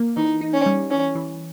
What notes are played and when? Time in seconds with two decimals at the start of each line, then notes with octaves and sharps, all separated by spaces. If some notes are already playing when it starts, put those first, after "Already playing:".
Already playing: A#3
0.16 E3 D#4
0.41 D#4
0.53 C#4
0.66 G3
0.91 E3 C#4
1.15 E3